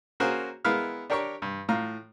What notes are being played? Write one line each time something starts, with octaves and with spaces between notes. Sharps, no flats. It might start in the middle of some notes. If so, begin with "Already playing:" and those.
A#3 C#4 F#4 G#4 A#4 C5
G#3 B3 E4 A#4 F5 F6
D4 G4 A#4 C#5 A#5 C#6
G2
A2 F4 A#5 F6